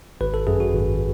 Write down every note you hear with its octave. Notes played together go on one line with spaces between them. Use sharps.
G#1 B4
A4
F#2 G#4
F#4
G#1